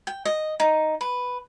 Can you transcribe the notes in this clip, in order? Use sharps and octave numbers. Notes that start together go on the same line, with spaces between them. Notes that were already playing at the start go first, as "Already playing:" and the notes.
G5
D#5
D#4
B4